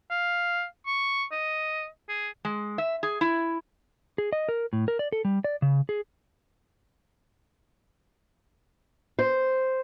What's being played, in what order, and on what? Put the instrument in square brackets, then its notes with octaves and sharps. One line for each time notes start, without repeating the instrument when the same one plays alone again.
[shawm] F5
C#6
D#5
G#4
[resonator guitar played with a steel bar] G#3
E5
G#4
E4
[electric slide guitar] G#4
D#5
A#4
A2
A#4
D5
A4
G3
D5
C#3
G#4
[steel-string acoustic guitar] C5